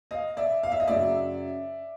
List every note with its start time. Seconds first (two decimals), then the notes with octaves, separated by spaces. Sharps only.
0.11 D#5 F5
0.37 D5 E5
0.63 F5
0.72 E5
0.80 D#5
0.88 F#2 C#3 F#3 D5 E5